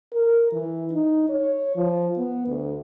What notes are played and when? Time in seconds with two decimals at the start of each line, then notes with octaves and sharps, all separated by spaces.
0.13 A#4
0.52 E3
0.92 D#4
1.29 C#5
1.76 F3
2.17 B3
2.47 D2